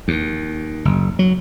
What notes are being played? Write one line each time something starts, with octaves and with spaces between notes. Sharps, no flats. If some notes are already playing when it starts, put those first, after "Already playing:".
D#2
F#1
F#3